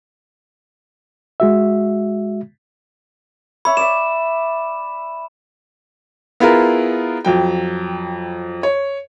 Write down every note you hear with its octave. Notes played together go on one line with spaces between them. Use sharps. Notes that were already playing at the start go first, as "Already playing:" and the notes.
G#3 F#4 E5
C#5 E5 B5
D5 E5 E7
B3 E4 F4 G#4 A#4
F2 F#3 G5
C#5